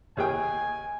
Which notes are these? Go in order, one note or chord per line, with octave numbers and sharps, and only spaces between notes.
D#2 G#4 G5 G#5